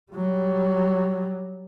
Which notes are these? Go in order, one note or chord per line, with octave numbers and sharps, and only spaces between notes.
F#3 G3